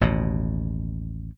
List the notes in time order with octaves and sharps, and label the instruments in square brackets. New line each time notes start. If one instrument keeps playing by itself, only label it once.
[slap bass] A1 D#2 B2